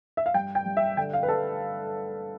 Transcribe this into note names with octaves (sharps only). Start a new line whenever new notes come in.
E5
F5
G2 G5
G5
G2
E5
D3 G5
F5
B4
D3 A4